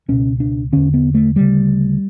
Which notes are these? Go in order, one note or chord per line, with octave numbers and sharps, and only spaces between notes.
C#2 B2 C#4
D4
E2 D3 C#4
B3
A3
D2 C#3 G3